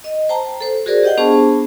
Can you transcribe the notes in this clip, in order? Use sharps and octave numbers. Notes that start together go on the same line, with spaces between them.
D#5
C5 G5 A5 A#5
A4 C5
F#4 G#4 A#4 C5 D5
G4 D#5 F#5 G5
B3 D4 G#4 C5 A5 C#6